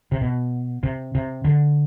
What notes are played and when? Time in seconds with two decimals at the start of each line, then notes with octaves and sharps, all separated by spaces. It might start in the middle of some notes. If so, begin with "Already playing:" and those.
0.12 C3
0.21 B2
0.83 C3
1.15 C3
1.45 D3